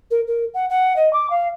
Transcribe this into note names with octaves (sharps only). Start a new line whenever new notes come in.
A#4
A#4
F#5
F#5
D#5
D6
F5